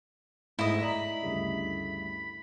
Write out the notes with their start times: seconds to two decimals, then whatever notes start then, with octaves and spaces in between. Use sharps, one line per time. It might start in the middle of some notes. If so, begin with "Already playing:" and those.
0.59 G#2 A3 E4 D#5
0.82 D5 A#5 B5
1.22 D2 G2 C#3